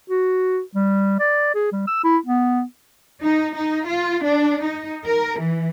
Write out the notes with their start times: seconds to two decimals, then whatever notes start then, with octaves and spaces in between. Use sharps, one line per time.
0.10 F#4
0.75 G3
1.20 D5
1.55 G#4
1.72 G3
1.88 E6
2.04 E4
2.26 B3
3.23 D#4
3.55 D#4
3.87 F4
4.25 D4
4.64 D#4
5.05 A#4
5.38 E3